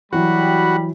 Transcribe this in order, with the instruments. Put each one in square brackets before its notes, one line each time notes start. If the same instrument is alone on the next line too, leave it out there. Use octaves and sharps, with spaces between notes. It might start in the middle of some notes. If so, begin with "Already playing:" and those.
[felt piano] E3 F#3 [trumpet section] G3 G5 B5 [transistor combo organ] F#4